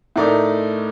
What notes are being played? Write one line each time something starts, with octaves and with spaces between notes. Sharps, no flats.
A2 A3 D#4 A#4 D5